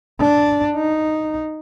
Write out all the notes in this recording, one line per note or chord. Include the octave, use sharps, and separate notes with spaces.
D4
D#4